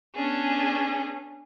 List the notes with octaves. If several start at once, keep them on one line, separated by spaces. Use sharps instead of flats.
B3 C#4 D4 G#4